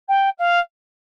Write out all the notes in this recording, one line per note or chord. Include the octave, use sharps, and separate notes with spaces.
G5
F5